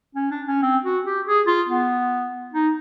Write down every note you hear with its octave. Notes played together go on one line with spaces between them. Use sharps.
C#4
D4
C#4
C4
F#4
G4
G#4
F4
B3
D#4